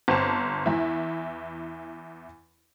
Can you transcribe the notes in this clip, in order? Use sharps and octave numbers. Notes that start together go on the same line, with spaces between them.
G1 C4 A5
E2 E3 E4